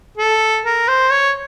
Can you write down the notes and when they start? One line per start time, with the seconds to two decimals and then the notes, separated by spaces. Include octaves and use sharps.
0.17 A4
0.65 A#4
0.88 C5
1.11 C#5